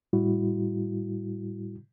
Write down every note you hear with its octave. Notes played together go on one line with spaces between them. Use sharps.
A2 G3 E4 F#4